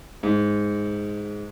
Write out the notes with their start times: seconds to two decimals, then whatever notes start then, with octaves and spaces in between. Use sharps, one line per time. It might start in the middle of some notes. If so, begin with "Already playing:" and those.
0.23 G#2